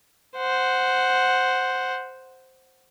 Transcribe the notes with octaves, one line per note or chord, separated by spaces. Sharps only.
C5 F#5